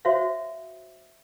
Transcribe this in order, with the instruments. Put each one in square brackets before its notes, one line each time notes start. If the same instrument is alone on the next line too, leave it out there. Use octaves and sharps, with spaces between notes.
[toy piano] F#4 C5 C#5 E5 F5